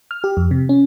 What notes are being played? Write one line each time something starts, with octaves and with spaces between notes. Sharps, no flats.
F6
G4
F2
C3
C#4